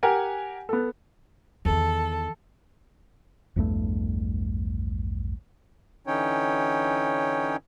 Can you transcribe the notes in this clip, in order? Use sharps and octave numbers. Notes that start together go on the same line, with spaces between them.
G4 A#4 F#5 G#5
B3 A4
E2 D#3 A4
A#1 E2 G2 A3
D3 E3 C#4 D#4 C#5 G5